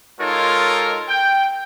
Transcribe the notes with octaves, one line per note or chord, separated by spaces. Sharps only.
G#3 D#4 F4 A4 A#4 C#5
G5